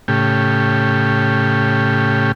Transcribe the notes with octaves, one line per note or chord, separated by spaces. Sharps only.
A2 C#3 G4